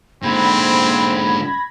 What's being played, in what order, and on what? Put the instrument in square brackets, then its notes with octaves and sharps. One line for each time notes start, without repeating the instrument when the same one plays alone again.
[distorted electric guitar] G#2 D3 [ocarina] A#3 [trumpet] C4 [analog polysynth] B5 G#6 A#6